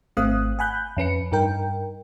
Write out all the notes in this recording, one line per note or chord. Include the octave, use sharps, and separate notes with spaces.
G#1 A3 C4 F5 D#6 F#6
F#5 G#5 B5 F#6 G6
F2 C#4 B4 C#7
G2 D#4 A#4 G5